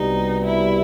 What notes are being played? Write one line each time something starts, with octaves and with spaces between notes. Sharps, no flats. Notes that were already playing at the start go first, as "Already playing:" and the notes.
Already playing: C2 B2 G3 D#4
E4